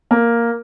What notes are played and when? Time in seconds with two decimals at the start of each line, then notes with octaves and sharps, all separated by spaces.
0.11 A#3